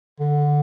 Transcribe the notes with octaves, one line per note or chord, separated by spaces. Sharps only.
D3